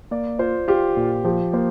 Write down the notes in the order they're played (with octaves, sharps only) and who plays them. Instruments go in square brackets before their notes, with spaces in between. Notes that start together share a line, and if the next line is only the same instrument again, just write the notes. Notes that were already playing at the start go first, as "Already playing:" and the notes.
[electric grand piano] A#3 [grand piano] D5
[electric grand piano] F4 [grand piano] C5
[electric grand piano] F4 [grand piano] G4
[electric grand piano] A#2
[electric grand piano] F3 [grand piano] G4
[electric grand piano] A#3 [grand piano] C5